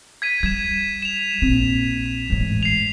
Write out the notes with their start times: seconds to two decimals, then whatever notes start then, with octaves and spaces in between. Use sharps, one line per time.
0.22 G#6 B6 D#7
0.43 G3 G#6 E7
1.02 E7 F7
1.42 A#1 C4
2.30 A1 G#2
2.63 C7 F7